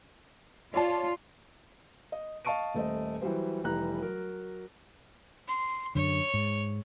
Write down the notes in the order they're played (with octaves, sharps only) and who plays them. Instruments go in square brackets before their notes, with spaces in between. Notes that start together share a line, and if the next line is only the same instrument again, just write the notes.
[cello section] F4 [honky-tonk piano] C#5 D5 A5
[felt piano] D#5
D#5 F5 A5 C#6 D7 D#7
D#1 A3 C5 D#5
E3 F#3 G3 C5
F1 E3 G3 A#5 F#6
F#3 A#4
[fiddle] C6
[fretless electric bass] F#2 D3 [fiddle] C#5
[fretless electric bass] G#2